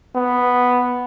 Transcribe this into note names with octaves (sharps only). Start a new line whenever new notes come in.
B3